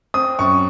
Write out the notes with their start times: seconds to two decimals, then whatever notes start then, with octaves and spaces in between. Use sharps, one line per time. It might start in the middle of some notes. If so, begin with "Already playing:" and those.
0.14 C4 D#6
0.39 F#2 C#6